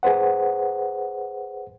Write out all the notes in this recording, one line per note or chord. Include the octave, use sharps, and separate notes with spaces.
G#4 B4 C5 F#5